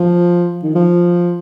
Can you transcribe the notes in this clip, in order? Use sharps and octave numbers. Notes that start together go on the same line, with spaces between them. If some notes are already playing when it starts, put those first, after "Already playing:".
Already playing: F3
D#3
F3